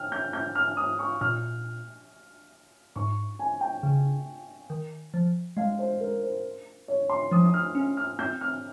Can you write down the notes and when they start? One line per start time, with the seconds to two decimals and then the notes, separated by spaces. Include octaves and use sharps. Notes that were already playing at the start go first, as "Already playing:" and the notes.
Already playing: G5 F6
0.12 G6
0.33 G6
0.55 F6
0.77 D#6
0.99 C#6
1.21 A#2 F6
2.96 G#2 C#6
3.39 G#5
3.61 G5
3.83 C#3
4.70 D#3
5.14 F3
5.57 G#3 F5
5.79 C5
6.01 A#4
6.23 C5
6.88 C#5
7.09 C6
7.31 F3 D#6
7.46 D#6
7.54 F6
7.75 C#4
7.97 F6
8.19 C4 G6
8.41 F6